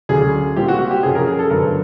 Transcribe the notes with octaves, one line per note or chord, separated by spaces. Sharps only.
D2 C#3 F#3 G#4
A#2 G3 C4 G4
F#4
F#4
G4
F#2 C#3 F3 G#4
A#4
G#4
A4
G2 D3 F#3 B3 A#4